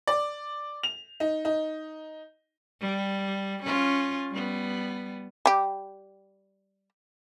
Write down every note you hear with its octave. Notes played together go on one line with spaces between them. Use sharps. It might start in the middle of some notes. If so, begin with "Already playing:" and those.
D5
F7
D#4
D#4
G3
C#4 F4
G3 B3
G3 G4